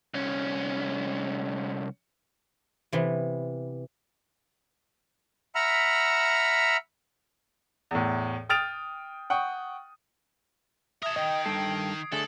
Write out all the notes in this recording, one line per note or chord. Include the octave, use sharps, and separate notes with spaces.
C2 C#4
C3 E3 B3
E5 F#5 A#5 B5 E6 F6
E2 A2
G5 D#6 F6 A6 D7 F7
F#5 G5 C#6 D#6
A#4 E5 A5 D#6 G#6
D#3 D#5 G5
G2 A4 C7 D7
D3 A3 G#4 A4 F#7